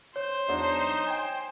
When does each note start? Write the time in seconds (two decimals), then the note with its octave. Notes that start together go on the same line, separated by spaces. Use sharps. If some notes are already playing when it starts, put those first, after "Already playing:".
0.16 C5 C#5
0.49 E2 F#3 D4 D#4
1.06 G5 G#5